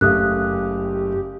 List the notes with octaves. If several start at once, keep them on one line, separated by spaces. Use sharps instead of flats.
F#1 A3 G4 E5 F5 D#6 F#6